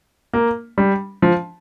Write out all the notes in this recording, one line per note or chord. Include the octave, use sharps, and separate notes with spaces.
A#3
G3
F3